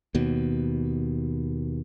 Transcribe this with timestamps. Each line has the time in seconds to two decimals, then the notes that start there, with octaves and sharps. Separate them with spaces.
0.15 D#2 B2